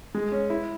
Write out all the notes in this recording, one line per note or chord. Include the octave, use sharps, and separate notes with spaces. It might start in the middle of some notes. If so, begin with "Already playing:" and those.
G#3
C#4
E4